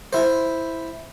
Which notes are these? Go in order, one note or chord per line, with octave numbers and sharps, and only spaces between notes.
E4 C5